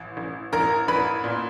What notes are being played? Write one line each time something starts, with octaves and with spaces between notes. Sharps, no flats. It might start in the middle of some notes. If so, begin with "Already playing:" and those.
Already playing: A1
A1
A1 A#4 A#5
A1 B4 B5
A#2